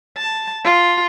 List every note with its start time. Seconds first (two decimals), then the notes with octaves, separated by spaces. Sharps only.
0.17 A5
0.64 F4